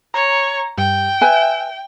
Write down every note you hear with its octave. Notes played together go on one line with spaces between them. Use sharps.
C#5 A#5
G2 G5
B4 E5 G#5